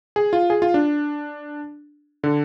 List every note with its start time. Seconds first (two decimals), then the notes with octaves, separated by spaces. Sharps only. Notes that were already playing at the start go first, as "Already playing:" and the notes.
0.16 G#4
0.33 F4
0.50 G#4
0.62 F4
0.74 D4
2.24 D3